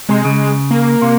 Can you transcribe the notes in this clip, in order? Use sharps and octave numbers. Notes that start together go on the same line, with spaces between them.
C3 G#3
C#3
A#3
C3